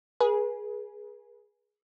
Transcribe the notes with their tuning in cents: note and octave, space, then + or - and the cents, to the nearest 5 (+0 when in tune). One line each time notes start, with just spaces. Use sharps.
G#4 +0 B4 -40